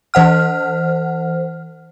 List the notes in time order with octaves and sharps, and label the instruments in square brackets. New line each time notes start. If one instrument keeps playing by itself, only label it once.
[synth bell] E3 C5 F#5 F6